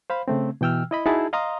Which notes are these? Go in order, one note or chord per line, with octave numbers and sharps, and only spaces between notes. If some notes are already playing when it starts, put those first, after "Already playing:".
C5 F5 B5
C#3 A3 C4
B2 E3 G5 E6 F6
E4 D#5 B5
D#4 E4 F#4 G#4 A5
D#5 F5 A#5 C6 D#6